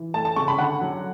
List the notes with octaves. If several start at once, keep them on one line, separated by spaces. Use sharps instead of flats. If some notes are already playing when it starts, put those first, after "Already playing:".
Already playing: E3
A3 A5
A5
C#3 C#6
B5
D3 F#5
F#3